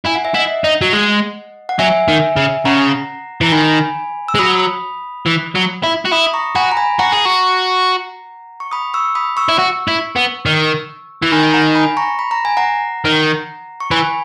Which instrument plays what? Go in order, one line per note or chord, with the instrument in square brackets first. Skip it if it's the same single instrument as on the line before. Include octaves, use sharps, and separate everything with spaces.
[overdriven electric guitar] E4 [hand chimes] G#5
[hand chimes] F#5
E5
[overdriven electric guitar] E4 [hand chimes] D#5 F#5
[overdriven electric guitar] D#4
F#3
G#3
[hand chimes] F#5
[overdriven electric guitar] F#3 [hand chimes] E5 G#5
[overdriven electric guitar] D#3
C#3
[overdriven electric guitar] C#3 [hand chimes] F#5 A#5
[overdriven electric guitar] E3 [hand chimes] A#5
[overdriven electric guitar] D#3 [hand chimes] G#5 B5
[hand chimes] E6
[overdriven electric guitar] G#3
[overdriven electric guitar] F#3 [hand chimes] B5 D#6
[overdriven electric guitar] E3
F#3
E4
F#4
[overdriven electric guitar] E4 [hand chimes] B5 D#6
[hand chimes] D#6
A#5 C#6
[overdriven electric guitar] F#4 [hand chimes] G#5 B5
[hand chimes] A#5
G#5 B5
[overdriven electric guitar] F#4 [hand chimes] F#5 A#5
[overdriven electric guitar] G#4
F#4
[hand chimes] C#6
B5 D#6
C#6 E6
B5 D#6
C#6 E6
[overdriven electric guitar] E4
F#4
E4
B3
D#3
E3
[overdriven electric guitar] D#3 [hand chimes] G#5 B5
[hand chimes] F#5 A#5
G#5 B5
A#5 C#6
B5
A#5
G#5
F#5 A#5
[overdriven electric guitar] D#3
[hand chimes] C#6
[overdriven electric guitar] E3 [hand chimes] G#5 B5